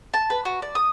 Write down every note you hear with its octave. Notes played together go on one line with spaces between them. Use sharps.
A5
B4
F#4
D5
D#6